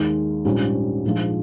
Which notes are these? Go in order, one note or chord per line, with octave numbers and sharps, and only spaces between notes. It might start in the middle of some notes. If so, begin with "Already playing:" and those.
Already playing: D#2 D#3 G#3
A#1 G#2 G3 C#4
A#1 G#2 F3 G#3